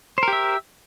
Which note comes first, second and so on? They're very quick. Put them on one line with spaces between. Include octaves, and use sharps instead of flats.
C5 A#4 G4 E5